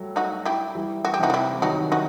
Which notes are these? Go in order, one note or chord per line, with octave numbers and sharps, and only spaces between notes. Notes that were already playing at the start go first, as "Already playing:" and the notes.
Already playing: F#3 G3 A3
D#4 F#4
E4 G4
E3 G3
F#4
G4
C3 E3 D#4 F#4
F#4
E4 G4
G3
D#3 F#3 D#4 F#4
D#4 F#4